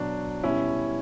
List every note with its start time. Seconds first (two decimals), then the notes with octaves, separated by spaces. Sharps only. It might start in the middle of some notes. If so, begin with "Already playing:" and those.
Already playing: B2 F#3 D4
0.43 B2 G3 C#4 E4